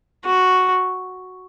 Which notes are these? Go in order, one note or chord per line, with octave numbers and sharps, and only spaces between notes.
F#4